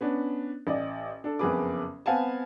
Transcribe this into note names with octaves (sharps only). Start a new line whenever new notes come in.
B3 C#4 D4
A1 D5 D#5
D4 A4
F#1 F2 B3 G#4 B4 D6
B3 C4 F5 F#5 G#5 A5